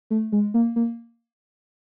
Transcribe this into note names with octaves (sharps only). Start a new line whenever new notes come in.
A3
G#3
A#3
A#3